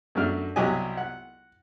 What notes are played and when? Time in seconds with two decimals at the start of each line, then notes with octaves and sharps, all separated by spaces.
0.15 F#2 A3 D4 F#4 F6
0.56 C2 F#3 G4 D#5 G#5
0.97 F#5